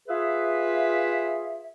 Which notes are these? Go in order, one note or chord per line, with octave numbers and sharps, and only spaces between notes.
F4 G#4 B4 E5